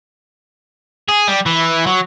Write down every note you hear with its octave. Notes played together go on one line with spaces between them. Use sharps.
G#4
G3
E3
F#3